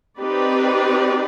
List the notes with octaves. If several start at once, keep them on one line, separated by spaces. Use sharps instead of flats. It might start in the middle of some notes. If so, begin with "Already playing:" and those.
C4 D#4 G4 B4 D5